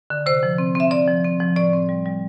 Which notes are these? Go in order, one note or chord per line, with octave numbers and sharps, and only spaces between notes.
D3
C3 C5
F3
C4
C4 E5
C4 D5
F3
C4
F3
A2 D5
C4
G3
G3